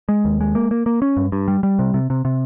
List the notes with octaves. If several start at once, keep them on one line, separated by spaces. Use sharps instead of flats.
G#3
D#2
G#3
A#3
A#3
A#3
C#4
G2
G2
G3
G3
C3
C3
C3
C3